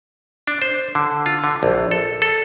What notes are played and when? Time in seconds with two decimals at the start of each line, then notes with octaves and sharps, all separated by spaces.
0.47 D4
0.62 C5
0.95 D3
1.26 F4
1.44 D3
1.63 A#1
1.91 A4
2.22 A4